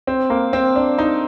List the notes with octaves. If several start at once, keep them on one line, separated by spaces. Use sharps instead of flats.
C4
A#3
C4
D4
D#4